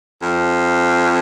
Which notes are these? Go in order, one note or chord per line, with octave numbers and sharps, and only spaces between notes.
F2